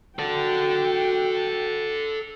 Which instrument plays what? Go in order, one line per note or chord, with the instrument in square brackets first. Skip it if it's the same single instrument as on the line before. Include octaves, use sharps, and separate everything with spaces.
[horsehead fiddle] F#4 G5 [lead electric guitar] A4 D5